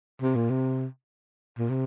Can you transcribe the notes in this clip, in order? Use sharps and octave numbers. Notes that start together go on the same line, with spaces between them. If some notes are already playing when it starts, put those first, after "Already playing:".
C3
A#2
C3
A#2
C3